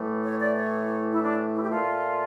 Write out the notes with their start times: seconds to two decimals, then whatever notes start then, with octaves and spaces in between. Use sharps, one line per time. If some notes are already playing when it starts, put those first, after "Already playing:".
Already playing: A2 E3 A3
0.24 C#5
0.40 D5
0.56 C#5
1.12 E4
1.22 D4
1.54 E4
1.62 G4
1.70 A#2 A3 F4